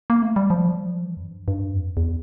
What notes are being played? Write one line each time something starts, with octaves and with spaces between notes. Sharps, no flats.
A#3
A3
G3
F3
G3
F3
E3
F2
G2
G2
F2
E2